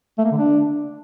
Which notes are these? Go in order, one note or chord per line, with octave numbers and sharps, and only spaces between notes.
A3
A#3
D3
D4